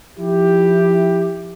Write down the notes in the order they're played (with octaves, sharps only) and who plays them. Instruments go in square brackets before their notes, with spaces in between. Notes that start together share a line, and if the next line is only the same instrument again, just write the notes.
[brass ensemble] F3 E4 G4